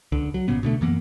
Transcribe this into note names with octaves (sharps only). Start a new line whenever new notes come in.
C#2 D3
F#3
G#1 A#2 C#3 B3
B2 D3 A3
F#2 E3 A#3 B3